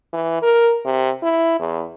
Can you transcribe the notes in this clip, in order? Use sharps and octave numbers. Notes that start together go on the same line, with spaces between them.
E3
A#4
C3
E4
E2